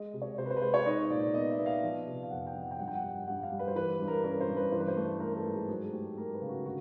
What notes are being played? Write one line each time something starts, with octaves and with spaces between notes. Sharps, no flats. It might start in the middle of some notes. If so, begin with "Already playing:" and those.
Already playing: G#3 D#5
C3
C#5
C3 C5
B4
C5
B4
G#3 C5
C#5
D#4 D#5
A#2 D5
B3 D#5
E5
B3
F5
F3
C3
F5
F2 F#5
G5
F3
F#5
G5
G2 F#5
G5
F#5
G3
G2 F#5
F5
G3
B4
C5
E3 B4
G2
A#4
C#4 A#4
C5
G2
B4
E3 C5
B4
C5
A3 B4
A3 A#4
A#4
A4
G#2
G#4
F#3 G#4
A3 G4
A3 A#4
B4
C#3
F#4
D3 F#4